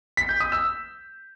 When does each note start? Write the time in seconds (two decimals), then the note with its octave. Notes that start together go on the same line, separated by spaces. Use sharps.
0.17 B6
0.29 G6
0.40 D#6
0.52 E6